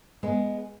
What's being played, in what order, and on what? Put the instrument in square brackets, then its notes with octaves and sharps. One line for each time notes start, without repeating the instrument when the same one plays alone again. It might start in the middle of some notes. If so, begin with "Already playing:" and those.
[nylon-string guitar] G#3 B3